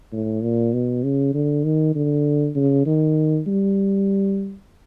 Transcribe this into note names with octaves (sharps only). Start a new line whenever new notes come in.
A2
A#2
B2
C#3
D3
D#3
D3
C#3
D#3
G3